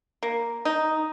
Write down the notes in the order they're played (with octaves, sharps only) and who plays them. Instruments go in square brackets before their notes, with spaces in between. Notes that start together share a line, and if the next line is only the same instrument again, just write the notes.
[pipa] A#3
D#4